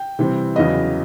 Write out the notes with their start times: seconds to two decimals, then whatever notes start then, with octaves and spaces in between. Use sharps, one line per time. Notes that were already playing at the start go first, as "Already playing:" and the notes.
Already playing: G5
0.19 C3 E3 G3 C4
0.56 E2 C#3 F#3 B3 D#5